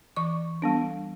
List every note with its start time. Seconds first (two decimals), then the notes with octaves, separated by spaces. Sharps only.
0.16 E3 C#6
0.62 G3 B3 D4